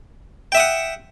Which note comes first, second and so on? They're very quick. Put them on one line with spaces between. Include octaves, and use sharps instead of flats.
G5 E5 D#6 F#5